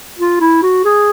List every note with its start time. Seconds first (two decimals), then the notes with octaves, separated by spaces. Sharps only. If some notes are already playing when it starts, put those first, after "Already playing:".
0.19 F4
0.41 E4
0.62 F#4
0.85 G#4